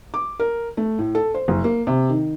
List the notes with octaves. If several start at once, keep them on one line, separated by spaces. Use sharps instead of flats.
D6
A#4
A3
A2
A4
C5
F#1
A#3
C3
D#3